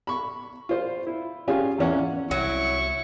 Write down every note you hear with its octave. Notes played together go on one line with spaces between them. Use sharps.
B5 C#6
F4 C5
E4
C#4 F4 G4 G#4 F5 G#5
E2 E3 C#4 F#5
C2 F#3 E4 C#6